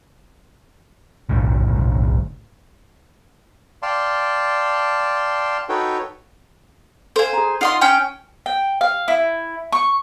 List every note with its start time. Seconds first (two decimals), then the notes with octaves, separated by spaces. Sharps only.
1.29 F#1 B1 A2 D3
3.83 D5 F5 G5 A5 C6
5.69 D#4 F#4 A4 B4 C#5 G5
7.16 A4 C5 F5 G#5
7.33 G#4 A#5
7.61 D#4 F4 D#5 F#5 C6
7.81 C#4 G5
8.46 G5
8.81 F5
9.08 E4
9.72 C#6